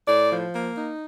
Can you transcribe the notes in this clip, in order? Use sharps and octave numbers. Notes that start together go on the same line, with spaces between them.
A2 D5
F3
A#3
D#4